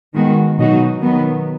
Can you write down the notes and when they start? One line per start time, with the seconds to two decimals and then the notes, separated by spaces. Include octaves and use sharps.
0.14 D#3 G#3 B3 F#4
0.58 B2 F#3 D#4 F#4
1.02 D#3 F#3 B3